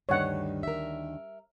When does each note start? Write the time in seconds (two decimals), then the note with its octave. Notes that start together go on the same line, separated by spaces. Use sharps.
0.09 D2 G2 D#3 D4 C#5 F#5
0.63 A#4 E5